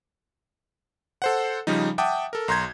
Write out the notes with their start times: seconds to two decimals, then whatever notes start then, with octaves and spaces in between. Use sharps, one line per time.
1.22 A4 C5 F#5
1.67 C#3 F3 G3 D#4
1.98 E5 F#5 G5 A5 D6 D#6
2.33 A4 A#4
2.48 B1 A#5 C6 G6 G#6